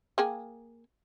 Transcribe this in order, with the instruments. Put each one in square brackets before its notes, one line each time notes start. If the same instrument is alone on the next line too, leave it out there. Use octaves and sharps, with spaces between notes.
[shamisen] A#3 G#4 G5